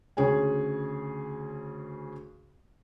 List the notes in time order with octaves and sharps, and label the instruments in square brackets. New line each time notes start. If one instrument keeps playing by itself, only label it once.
[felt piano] D2 C#3 G#4 C#5 G#5